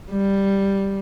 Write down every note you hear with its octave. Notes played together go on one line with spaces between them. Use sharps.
G3